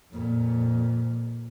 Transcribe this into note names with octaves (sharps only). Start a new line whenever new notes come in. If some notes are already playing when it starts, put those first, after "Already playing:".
F2 A#2